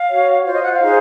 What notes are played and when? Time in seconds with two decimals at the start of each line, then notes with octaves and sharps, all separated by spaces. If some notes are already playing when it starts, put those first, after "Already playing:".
Already playing: F5
0.10 F#4 C#5
0.45 F4 C5 C#5
0.55 D#5
0.64 F#5
0.72 F5
0.82 D#4 G#4 C5